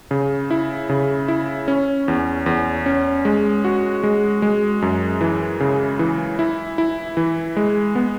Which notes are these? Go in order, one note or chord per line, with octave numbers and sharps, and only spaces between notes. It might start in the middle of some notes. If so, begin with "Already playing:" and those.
C#3
E4
C#3
E4
C#4
E2
E2
C#4
G#3
F#4
G#3
G#3
F#2
E3
C#3
E3
E4
E4
E3
G#3
B3